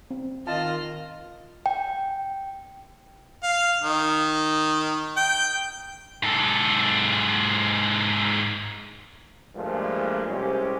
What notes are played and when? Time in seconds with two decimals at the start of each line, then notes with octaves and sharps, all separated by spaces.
0.11 C4
0.47 D#3 F4 D#5 A5 F6
1.66 G5
3.43 F5
3.82 D#3
5.16 G5
6.23 G#2 A4
9.56 G2 A#2 F3 G#3 A3 D4
10.29 C2 G#3 C#4 G4 C5